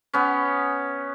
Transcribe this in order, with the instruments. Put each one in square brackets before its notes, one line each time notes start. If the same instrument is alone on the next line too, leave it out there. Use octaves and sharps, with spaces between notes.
[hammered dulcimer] B3 C#4